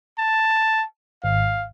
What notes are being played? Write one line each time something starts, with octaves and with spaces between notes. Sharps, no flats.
A5
G#1 F5